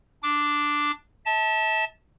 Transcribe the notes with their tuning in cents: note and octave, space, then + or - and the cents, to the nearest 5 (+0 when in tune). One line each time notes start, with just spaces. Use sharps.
D4 +0 D6 +0
E5 -45 A5 +0